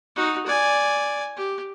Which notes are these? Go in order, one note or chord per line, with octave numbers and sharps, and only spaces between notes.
D#4 F#4
D5 G#5
G4